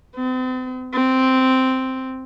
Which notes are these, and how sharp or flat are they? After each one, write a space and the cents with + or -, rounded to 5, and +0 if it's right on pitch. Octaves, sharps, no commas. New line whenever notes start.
C4 -40
C4 -5